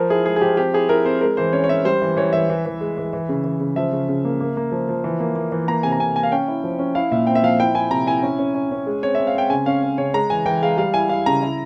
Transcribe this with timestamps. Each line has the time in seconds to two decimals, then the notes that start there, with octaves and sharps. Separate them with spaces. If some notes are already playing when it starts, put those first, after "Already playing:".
Already playing: F3 A#4
0.10 E4 G#4
0.26 G#3 G#4
0.36 G#4
0.41 F3 G4
0.57 C4 G4
0.74 E4 G#4
0.89 E4 A#4
1.05 C4 C5
1.21 G#3 A#4
1.37 E3 C5
1.53 C#4 C#5
1.64 C#5
1.69 C#4 E5
1.85 G3 C5
2.02 E3
2.17 E3 C#5
2.33 E3 E5
2.50 E3
2.66 E3
2.81 G#3
2.97 E3
3.13 E3
3.29 C#3
3.44 E3
3.60 C#3
3.76 F3 E5
3.93 C#3
4.08 C#3
4.25 A#3
4.40 A#3
4.57 A#3
4.72 F3
4.89 F3
5.04 E3
5.20 A#3
5.36 A#3
5.52 E3
5.68 A#3 A#5
5.83 C3 G#5
5.92 A#5
5.99 C3 G#5
6.16 A#3 G#5
6.23 F5
6.32 C#4 G5
6.48 E4
6.64 F3
6.79 C#4
6.95 E4 F5
7.11 A#2 E5
7.27 C4 G5
7.35 E5
7.43 F3 F5
7.60 E4 G5
7.75 E4 G#5
7.91 C3 A#5
8.07 E4 G#5
8.23 C#4
8.39 C#4
8.55 C#4
8.71 C#4
8.87 G#3
9.03 C4 C#5
9.15 C4 E5
9.27 F5
9.35 C4 G5
9.50 C#3 G#5
9.66 C#4 F5
9.83 C#4
9.98 C#3 C#5
10.14 G#3 A#5
10.30 E3 G#5
10.46 E3 G5
10.62 G#3 F5
10.78 G3 F5
10.94 E4 G#5
11.09 E4 F5
11.26 C#3 A#5
11.42 E4